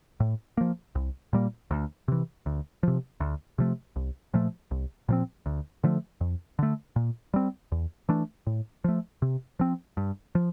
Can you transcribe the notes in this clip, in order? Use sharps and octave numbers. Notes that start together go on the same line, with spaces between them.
A2
F3 A#3
C2
A#2 G3 A#3
D2
C3 E3
D2
C3 F3
D2
C3 F3 A3
C2
A#2 F3 A3
C2
A#2 F3 C4
D2
D3 F3 A3
F2
D3 A3
A#2
G3 C4
E2
E3 A3 D4
A2
F3 A3
C3
F3 C4
G2
F3